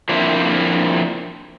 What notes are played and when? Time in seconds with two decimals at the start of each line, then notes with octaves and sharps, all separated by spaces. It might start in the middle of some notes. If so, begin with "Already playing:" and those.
0.09 F3 A#3 C4 D4 E4